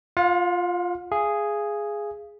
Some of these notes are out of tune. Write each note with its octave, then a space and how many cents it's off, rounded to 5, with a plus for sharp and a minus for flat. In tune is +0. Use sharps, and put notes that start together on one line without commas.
F4 +0 F5 +45
G#4 +0 F5 -30